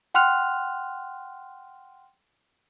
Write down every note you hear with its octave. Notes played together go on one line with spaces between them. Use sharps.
F#5 G5 C6 F6 F#6 F7